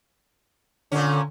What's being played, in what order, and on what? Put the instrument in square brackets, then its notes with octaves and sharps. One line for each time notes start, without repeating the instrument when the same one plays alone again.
[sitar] A#2 C#4 [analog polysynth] D3